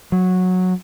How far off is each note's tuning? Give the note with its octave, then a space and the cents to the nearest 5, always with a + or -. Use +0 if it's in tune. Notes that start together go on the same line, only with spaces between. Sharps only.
F#3 -10